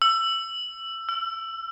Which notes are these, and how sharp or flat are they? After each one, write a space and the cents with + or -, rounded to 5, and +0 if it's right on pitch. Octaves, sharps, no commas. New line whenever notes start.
E6 +20
E6 +45